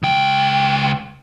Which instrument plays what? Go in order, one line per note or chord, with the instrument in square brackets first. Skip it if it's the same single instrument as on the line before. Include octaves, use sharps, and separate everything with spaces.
[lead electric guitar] C#2 G5